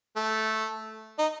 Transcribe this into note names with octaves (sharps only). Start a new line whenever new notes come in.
A3
D#4